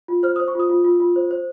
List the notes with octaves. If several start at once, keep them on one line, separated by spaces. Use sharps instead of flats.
F4
C5 F6
C5 D#6
C#6
F4 D#6
F4
F4
F4
C5
C5